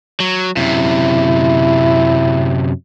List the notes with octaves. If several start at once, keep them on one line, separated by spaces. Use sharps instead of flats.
F#3
F#2 C3 E4